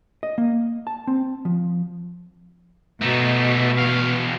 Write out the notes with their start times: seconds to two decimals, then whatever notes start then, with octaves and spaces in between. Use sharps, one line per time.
0.23 D#5
0.38 A#3
0.87 A5
1.07 C4
1.45 F3
3.02 B2 A3 D#4
3.79 E2 F5